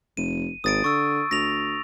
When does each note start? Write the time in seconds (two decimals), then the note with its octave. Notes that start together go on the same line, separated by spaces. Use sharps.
0.17 F1 D#7
0.64 G#1 D#6 A6 D7
0.84 D3 C#6 E6
1.31 D2 A#6 F7